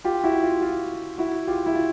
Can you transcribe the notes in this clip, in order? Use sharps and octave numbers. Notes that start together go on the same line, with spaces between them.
F4 G4
E4 F#4
F4
F4
E4 F#4
F4 G4
E4
F4